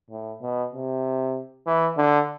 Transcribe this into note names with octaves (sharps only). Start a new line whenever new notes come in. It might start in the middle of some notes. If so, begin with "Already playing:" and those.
A2
B2
C3
E3
D3